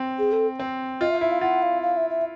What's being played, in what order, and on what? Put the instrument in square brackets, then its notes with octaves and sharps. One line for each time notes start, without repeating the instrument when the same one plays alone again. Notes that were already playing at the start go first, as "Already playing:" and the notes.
Already playing: [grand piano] C4
[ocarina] G#4
A4
[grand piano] C4
[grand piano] F4 [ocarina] D#5
[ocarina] E5
[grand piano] E4 [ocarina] E5
[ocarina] F5
[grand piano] F4 [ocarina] F#5
[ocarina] F5
F5
E5
E5